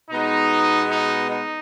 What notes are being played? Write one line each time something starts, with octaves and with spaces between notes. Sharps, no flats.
B2 G#3 B3 D#4
D#4
D#4